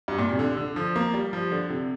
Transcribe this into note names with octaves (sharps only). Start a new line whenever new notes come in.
G2
A#2
C3
D3
D3
F3
A#3
G3
F3
D3
C3